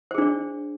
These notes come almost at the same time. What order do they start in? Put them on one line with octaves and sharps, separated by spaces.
C5 G#4 D4 D5